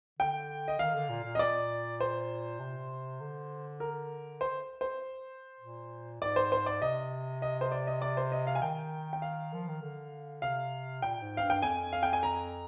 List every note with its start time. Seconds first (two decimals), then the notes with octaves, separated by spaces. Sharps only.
0.19 D3 G5
0.68 D#5
0.79 D#3 F5
0.95 D3
1.09 A#2
1.25 A#2
1.35 D#5
1.39 D5
2.00 C5
2.60 C3
3.20 D3
3.80 A#4
4.41 C5
4.81 C5
5.61 A#2
6.22 G#2 D5
6.36 C5
6.52 C5
6.66 D5
6.82 C3 D#5
7.42 D#5
7.61 C5
7.72 D5
7.87 D#5
8.02 D5
8.17 C5
8.32 D#5
8.47 F5
8.55 G#5
8.62 D#3 G5
9.13 G5
9.22 F5
9.54 F3
9.68 D#3
9.82 D3
10.42 C3 F5
11.02 A#2 G5
11.22 G#2
11.37 F5
11.43 G2
11.50 G5
11.62 F2 G#5
11.93 F5
12.03 G5
12.13 G#5
12.23 A#5